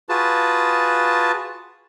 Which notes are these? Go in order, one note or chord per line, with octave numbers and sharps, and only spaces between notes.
F4 F#4 G#4 B4 A5